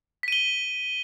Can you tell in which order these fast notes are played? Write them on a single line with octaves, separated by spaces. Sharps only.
B6 D#7 G7